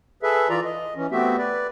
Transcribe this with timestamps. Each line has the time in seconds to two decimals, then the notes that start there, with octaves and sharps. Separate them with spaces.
0.23 G#4 A4 B4 E5
0.49 E3 F4 D5 A#5
0.65 D#5
0.96 E3 C#4
1.11 A3 B3 C4 F#4 G4 E5
1.38 B4 D5